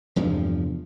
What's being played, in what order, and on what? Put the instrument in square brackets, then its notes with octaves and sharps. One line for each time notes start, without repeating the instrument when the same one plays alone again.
[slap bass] F1 E2 G2 F3